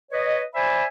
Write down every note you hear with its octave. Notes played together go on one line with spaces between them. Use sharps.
B4 C#5 D#5
C5 D5 E5 G#5 B5